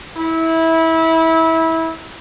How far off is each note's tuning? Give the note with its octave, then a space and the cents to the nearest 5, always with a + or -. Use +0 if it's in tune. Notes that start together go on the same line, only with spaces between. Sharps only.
E4 -20